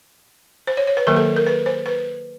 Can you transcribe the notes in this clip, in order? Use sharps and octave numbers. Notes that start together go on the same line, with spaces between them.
C5
C#5
C#5
B4
D#3 F#3 A#3 A#4
A4
A#4
B4
C5
B4